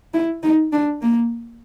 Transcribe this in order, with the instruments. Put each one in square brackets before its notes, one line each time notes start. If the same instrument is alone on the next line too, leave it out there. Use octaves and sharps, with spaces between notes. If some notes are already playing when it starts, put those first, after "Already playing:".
[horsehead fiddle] E4
D#4
D4
A#3